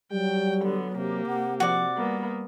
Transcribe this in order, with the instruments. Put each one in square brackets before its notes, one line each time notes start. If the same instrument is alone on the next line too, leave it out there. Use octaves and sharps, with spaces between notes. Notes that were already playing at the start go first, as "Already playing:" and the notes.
[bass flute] F#3 [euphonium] G3 [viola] G5
[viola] D3 B3
[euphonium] C3 [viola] A#3 G4
[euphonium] C3 [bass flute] F#5
[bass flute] F3 [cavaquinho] F#4 D5
[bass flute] G3 [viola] A#3 B3